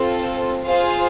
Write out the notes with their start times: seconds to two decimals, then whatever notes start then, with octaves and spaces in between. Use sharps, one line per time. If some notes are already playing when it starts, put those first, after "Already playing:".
Already playing: C4 F4 A4
0.66 F4 G#4 C5 F5